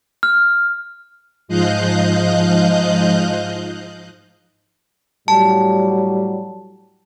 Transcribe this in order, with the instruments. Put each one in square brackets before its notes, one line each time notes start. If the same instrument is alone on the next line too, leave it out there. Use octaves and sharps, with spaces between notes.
[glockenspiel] F6
[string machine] G#2 F3 D#5 F5 F#6 G6
[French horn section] A2 F#3 G3 [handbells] A5